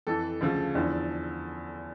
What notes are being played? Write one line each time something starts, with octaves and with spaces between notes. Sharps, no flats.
F2 E3 A4
D2 C#3 F3
E2 D3 F3